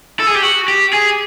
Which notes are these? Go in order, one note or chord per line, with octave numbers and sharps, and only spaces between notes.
A4
G#4
G4
F#4
G4
G#4